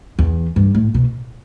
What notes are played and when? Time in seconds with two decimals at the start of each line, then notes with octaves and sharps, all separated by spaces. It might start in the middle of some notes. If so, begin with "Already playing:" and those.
0.19 E2
0.56 G2
0.75 A2
0.94 B2